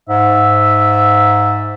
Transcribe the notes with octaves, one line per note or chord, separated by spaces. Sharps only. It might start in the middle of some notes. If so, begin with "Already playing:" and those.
G#2 E5